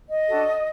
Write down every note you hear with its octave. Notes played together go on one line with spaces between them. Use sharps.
D#5
D4 F#4 A4